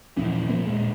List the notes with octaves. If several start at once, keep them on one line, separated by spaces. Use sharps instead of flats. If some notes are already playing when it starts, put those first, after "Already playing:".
D#1 A#1 E3 C#4
G2 A#2 F3 A#3
D#1 A#2 G#3